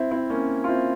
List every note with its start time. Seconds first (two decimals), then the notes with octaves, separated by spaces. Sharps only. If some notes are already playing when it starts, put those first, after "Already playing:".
Already playing: C4 E4
0.11 C4 E4
0.30 A#3 C#4
0.64 F4
0.68 C4 E4